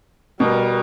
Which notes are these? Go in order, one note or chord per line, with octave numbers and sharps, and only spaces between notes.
B2 G3 A#4